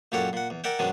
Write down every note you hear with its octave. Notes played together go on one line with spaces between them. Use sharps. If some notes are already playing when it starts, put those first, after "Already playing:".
F#2 A#2 G4 A4 C#5 F#5
A#2 F#5
E2
A#4 D5 E5 F#5 G5
F#2 B2 D#3 F#3 G#3 D4